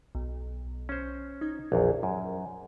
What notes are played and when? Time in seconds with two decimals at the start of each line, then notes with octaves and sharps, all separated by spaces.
0.15 B1
0.89 C#4 C5
1.41 D#4 G#6
1.72 A#1 E2
2.03 F#2